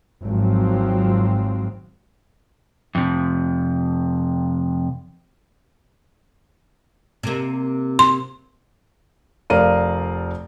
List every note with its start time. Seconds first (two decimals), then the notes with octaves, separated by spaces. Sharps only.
0.23 G#1 F3 F#3 C4
2.95 F2 C3
7.23 C3 A#3
7.99 C6
9.50 F1 A#4 D5 F5 D#7